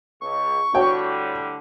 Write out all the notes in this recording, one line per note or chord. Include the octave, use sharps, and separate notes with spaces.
C#2 C#6
A2 D3 G3 F#4 C#5 G5